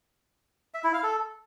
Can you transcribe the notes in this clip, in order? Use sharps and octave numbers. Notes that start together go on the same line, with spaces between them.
E5
E4
F5
A4